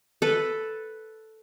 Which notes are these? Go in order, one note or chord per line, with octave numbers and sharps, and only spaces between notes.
A4 B4